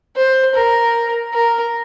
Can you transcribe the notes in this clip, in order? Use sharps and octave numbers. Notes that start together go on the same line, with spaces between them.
C5
A#4
A#4